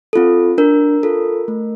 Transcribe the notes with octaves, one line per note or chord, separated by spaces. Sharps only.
C4 F4 A4
D4 A#4
F4 A4
A3